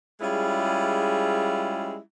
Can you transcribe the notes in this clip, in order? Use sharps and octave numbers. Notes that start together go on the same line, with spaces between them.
G3 G#3 C#4 E4 F4 G#4